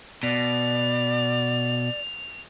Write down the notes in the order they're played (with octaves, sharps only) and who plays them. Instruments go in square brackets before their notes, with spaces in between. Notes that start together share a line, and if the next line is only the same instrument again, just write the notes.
[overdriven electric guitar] B2 [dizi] D5 [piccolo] F7